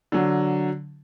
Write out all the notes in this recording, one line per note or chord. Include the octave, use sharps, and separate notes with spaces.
D3 F#3